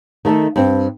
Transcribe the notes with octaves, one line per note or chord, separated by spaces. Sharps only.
D#3 A3 A4 D#5
G2 C4